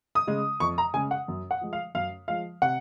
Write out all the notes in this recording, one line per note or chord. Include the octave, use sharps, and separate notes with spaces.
D#6
C#3 G#3
F2 C#6
A#5
C#3 G#3 G#5
F#5
F#2
F#5
F3 G#3
F5
F#2 F5
F3 G#3 F5
C3 F#5